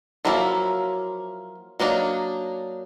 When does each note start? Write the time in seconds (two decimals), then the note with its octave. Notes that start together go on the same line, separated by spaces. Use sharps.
0.25 F3 F#3 A#3 E4 F4
1.80 F#3 A#3 D4 D#4